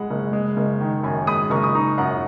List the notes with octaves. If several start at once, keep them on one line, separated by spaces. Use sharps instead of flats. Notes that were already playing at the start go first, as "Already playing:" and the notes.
Already playing: G#3 F#5 B5
F#1
G#3
F#1
D#3
F#2 G#5 B5
G#3 B5 D#6
F#1 A#5 C#6
D#6
D#4 A#5 C#6
F#2 F#5 A#5